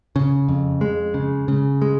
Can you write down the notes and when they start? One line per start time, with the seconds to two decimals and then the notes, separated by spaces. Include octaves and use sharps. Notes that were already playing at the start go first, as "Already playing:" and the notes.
0.16 C#3
0.49 F2
0.81 G#3
1.14 C#3
1.48 C#3
1.82 G#3